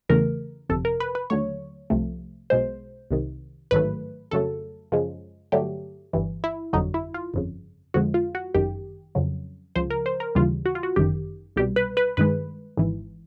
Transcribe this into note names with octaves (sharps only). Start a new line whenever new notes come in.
E2 C#3 E3 A3 A#4
G1 F2 C3 A4
A#4
B4
B4
D#2 D3 F#3 A3 C#5
C2 C3 F3 A3
B1 B2 G#3 C5
C2 C3 D#3
A1 G#2 D#3 F#3 A3 B4
F2 C#3 F#3 A3 A4
F#2 C#3 F3 G#3
G2 D3 F#3 A3 G4
G1 G2 E3
E4
G1 F2 D3 F#3 D#4
E4
F4
G1 F2 C#3
F2 D3 F3 G#3 F#4
F4
F#4
G1 F#2 D#3 G4
F2 C#3 F#3
C#2 C#3 F3 C5
A#4
C5
A#4
D#2 C#3 E3 G3 F4
F#4
F4
F#4
G1 F#2 D#3 G4
C2 B2 G3 G4
B4
B4
G2 D#3 G#3 B4
G#1 G#2 E3